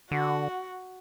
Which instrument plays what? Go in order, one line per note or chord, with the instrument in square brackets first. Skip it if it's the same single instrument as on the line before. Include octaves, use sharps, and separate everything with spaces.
[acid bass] D3 [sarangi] F#4